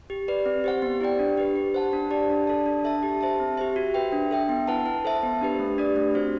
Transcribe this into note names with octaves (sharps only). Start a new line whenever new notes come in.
G4
B4 D5
C4
G4 C5 F#5
B3
E4 G4 D5 G5
D4
G4 B4
G4
C5 F#5 A5
D4
G4 D5 A5
D4
A4 D5 A5
D4
A4 E5 A5
G4
C5 E5 A5
C4
G4 C5 E5
F#4
B4 E5 G5
D4
A4 E5 G5
B3
E4 B4 F#5 A5
E4
A4 C5 E5 A5
B3
D4 G4 B4
A3
D4 G4 B4 D5
A3
C4 F#4 C5